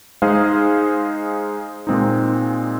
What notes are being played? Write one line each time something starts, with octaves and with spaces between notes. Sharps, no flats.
G#3 D#4 G#4 C5 F5
A#2 G#3 C4 D#4